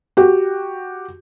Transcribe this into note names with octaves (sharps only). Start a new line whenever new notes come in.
F#4 G4